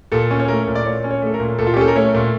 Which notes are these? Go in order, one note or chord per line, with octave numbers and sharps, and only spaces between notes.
A#2 A4
C#4
C#5
A3 A#4
A#2
D5
A#2 C#5
C#4
C#5
A3 A4
A#4
A#2
A#2 A4
F4
G4
C#4 A4
A#4
A3 C#5
A#2